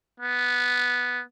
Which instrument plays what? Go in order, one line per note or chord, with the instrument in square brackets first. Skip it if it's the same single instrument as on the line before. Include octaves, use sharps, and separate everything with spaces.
[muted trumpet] B3